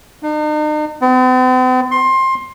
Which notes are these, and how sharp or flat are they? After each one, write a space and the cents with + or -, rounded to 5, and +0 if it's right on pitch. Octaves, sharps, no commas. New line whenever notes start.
D#4 -45
C4 -45
C6 +20